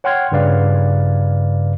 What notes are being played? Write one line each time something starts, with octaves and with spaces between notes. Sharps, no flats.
C#5 F#5 G5 C6 F6 G#6
G2 C#3 B4 D5 F5